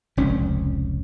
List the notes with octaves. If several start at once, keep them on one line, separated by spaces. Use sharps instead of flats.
F1 C#2 C#4